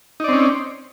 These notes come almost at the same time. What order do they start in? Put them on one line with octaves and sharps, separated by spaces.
D#4 D5 C4 C#4